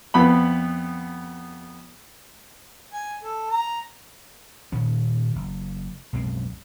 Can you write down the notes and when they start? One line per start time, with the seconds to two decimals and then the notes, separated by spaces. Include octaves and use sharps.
0.14 F2 B3 B5
2.93 G#5
3.23 A4
3.51 A#5
4.72 A#2 D#3 C#4
5.35 F#1
6.13 B1 F#2 G#3 C4